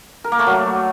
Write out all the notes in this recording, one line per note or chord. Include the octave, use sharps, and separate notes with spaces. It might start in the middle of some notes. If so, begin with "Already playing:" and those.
A#4
A#3
A3
F#3